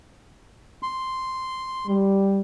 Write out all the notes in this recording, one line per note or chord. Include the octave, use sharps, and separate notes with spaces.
C6
G3